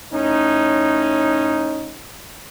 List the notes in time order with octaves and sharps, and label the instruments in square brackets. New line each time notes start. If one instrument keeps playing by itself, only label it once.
[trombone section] A2 C#4 D#4